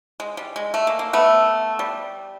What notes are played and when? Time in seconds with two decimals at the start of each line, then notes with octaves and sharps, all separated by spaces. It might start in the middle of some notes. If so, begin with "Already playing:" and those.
0.20 G#3
0.37 G3
0.56 G#3
0.74 A3
0.87 A#3
0.99 A#3
1.13 A3 B3
1.79 G3